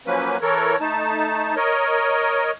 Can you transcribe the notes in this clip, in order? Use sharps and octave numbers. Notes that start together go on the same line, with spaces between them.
F3 F#3 A#3 C#4 B4
E3 A4 A#4 C#5
A3 D#4 A5
A#4 C#5 D#5